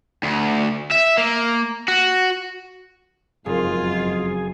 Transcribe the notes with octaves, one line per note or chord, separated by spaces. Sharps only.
D2
E5
A#3
F#4
F#1 F2 G#2 F4 G#4